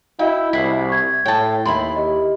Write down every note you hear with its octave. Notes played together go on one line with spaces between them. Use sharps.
E4 F#4 D#5 F5 G5
C2 E4 F#5 B6 C7
C#6 G#6
A2 C#5 G5 A5
D#2 E4 B5 C6
G4 D#5